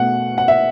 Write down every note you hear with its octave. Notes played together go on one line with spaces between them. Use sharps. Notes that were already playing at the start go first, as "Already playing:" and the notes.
Already playing: B2 A3 F#5
F#5
E5